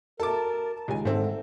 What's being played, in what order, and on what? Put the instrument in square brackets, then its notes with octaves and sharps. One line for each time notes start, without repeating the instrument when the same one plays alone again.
[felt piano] F#4 E5 [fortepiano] A4 D6 [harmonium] A#4 [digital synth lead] A5
[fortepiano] C#2 G#5 [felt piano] D#3 G#3 G4
[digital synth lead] G#2 [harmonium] D3 [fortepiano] A3 C4